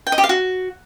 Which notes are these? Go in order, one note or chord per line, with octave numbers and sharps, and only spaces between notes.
G5
D#5
G4
F5
F#4